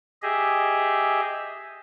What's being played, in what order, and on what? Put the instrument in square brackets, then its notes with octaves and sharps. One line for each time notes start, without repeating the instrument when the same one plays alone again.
[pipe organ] G4 G#4 D#5 E5